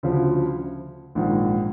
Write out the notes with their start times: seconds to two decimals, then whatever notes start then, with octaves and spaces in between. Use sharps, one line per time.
0.03 D2 C#3 F3
1.15 A#1 G#2 D#3